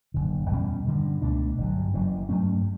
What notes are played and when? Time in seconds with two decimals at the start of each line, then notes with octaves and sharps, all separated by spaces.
0.14 F#1 E2 D3
0.51 E2 B2 G3 C#4
0.87 G2 D3 G3
1.22 C#2 B2 A3 D4
1.58 G1 G2 F#3
1.94 F#1 F#2 E3
2.29 G2 F#3 A3 C#4